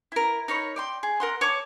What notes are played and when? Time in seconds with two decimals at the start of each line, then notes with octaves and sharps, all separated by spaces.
0.12 E4 A#4
0.48 D#4 A#4 C#5 B5
0.76 D5 G5 C6
1.03 G#4
1.20 A#4 F#5 C6
1.41 C#5 A5 D6